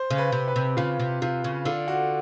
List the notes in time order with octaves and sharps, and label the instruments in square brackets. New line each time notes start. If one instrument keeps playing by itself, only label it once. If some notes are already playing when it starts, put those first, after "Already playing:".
Already playing: [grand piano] C5
[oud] C#3
[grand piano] B4
[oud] C3
[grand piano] B4
[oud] C3
[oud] C#3 [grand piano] F4
[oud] C3
[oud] C3 [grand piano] F4
[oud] C#3
[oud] D3 [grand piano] F4
[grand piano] F#4